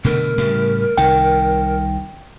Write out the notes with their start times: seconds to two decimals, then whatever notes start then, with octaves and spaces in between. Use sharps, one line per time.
0.04 B2 D3 A3 A#4
0.38 A2 C#3 G3
0.97 C2 D#3 G5